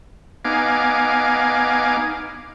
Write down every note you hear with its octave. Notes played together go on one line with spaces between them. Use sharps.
B3 D#4 F5 G#5 D6